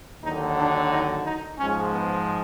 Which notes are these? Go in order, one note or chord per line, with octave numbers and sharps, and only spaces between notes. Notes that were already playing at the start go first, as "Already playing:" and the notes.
D#2 D3 F#3 D#4
D4
D#4
D#4
G#2 F3 G#3 C#4
B3